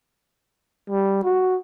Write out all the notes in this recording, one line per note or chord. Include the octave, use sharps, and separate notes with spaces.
G3
F#4